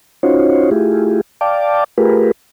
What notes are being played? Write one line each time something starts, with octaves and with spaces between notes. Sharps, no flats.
C#4 D#4 F4 F#4 C5 C#5
A3 E4 F4 G4 G#4
D5 F5 G5 A5 D6
A3 F4 G4 G#4 A#4 B4